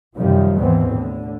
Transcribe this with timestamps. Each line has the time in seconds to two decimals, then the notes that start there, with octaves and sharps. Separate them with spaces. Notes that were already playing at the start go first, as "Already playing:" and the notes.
0.15 F#2 C3 D#3 F3 G3
0.57 D#2 G#2 B2 E3 B3 C4
0.90 A2 D3